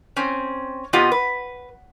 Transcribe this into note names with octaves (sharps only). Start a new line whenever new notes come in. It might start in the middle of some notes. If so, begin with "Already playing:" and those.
C4 C#4
C3 B3 F4 G4 D#5
B4